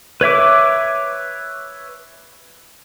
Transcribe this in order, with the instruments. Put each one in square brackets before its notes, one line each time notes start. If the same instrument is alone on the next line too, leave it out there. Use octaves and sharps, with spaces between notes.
[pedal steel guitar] B4 C#5 E5 D6